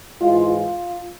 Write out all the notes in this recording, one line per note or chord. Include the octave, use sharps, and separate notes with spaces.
G#2 E3 G#3 F4
F4